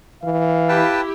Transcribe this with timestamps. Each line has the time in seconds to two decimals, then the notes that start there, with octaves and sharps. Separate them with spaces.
0.23 E3 F5
0.69 E4 G4 B4 G5 A5